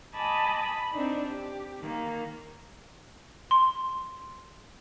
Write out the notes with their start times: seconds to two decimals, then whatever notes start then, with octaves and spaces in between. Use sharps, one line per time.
0.15 D#5 G#5 A5 B5 D6 D#6
0.62 B5
0.93 C4 D4 D#4
1.26 G4
1.79 D#3 A#3
3.51 C6